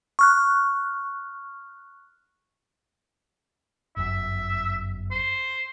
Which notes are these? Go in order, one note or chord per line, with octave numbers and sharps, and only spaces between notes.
C#6 F6 F#6
G1 F#2 E5
C5